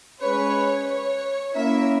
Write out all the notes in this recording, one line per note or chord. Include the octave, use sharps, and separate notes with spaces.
G#3 C#4 G#4 B4 C#5
C#5
A#3 C#4 E4 A#4 E5